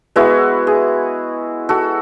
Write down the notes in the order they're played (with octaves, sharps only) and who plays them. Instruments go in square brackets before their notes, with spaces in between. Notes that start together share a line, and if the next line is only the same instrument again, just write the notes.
[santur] G#3 B3 E4 F#4
G#4
F#4 A4